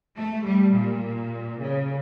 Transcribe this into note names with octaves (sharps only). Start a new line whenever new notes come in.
A3
G3
A#2
C#3